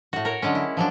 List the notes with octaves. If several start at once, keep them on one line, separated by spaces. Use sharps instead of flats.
A2 F#4
A#4 C#5
D3 F#3 G#3 C#4
E4
F3 F#3 D4